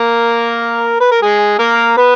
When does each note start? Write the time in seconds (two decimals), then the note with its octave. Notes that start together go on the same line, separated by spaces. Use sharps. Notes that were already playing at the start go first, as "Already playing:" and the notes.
Already playing: A#3 A#4
1.00 B4
1.11 A#4
1.21 G#3 G#4
1.59 A#3 A#4
1.97 B3 B4